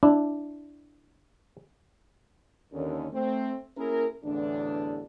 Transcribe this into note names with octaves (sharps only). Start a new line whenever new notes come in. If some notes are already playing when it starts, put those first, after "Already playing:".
D4 E4
D#2 D3 C#4
A3 C4
A#3 C#4 E4 G#4 A#4
A1 E2 D3 D4